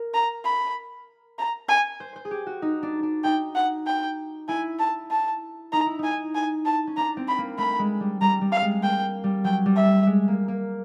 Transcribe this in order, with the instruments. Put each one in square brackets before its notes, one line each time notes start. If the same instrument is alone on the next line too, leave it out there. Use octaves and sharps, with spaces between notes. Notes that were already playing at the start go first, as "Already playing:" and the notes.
Already playing: [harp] A#4
[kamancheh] A#5
B5
A#5
G#5
[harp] C5
C5
G#4
G4
F#4
D#4
D4
D4
[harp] D#4 [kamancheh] G5
[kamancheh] F#5
G5
[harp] E4 [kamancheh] G#5
[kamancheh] A5
A5
[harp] D#4 [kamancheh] A#5
[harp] E4
[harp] D#4 [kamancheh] G#5
[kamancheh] G#5
A5
[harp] C#4
[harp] D4 [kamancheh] A#5
[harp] C4
[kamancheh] B5
[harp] A#3
[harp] A3 [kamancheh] B5
[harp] G#3
G3
[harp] G3 [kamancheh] A#5
[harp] G3
[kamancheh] F5
[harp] G#3
[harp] A#3 [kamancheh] G5
[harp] G3
[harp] F#3 [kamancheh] G5
[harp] G3
[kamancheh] E5
[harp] A3
G#3
A#3
A#3